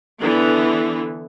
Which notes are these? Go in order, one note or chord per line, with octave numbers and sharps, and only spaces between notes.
D3 E3 B3